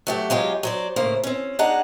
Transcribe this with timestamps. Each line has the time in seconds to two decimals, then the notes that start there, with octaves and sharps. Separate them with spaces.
0.07 F#3 A3 G4
0.30 F#3 G#3 F4 G4
0.63 F#3 C5 D5
0.96 A2 C#3 A#3 C5
1.23 C4 C#4
1.59 D4 D#4 G#4 F#5 A5 A#5